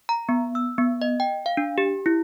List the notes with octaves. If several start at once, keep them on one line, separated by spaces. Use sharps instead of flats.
A#5
B3
E6
B3
D#5
G5
F5
D4
G4
E4